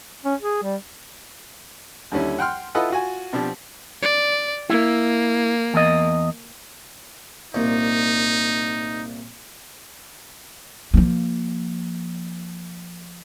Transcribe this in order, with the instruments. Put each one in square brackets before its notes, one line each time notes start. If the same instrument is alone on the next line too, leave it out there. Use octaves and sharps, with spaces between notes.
[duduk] C#4
G#4
G3
[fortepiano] D#2 D3 G3 C#4 E4
F#5 G5 C6 F6
E4 F4 A4 B4 D#5 F#5
F4 F#4 G#5
B2 F3 C4 D4 G4
[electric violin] D5
[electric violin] A#3 [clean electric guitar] E4
[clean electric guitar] E2 D#5
[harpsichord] C2 A#2 [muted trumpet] D#4
[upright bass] F3 A#3